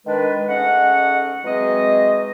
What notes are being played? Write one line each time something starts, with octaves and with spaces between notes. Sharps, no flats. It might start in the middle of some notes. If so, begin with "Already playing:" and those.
D#3 G#3 D4 B4
G#2 A3 C#4 D#5 F#5
E3 F#3 G#3 C4 G#4 D#5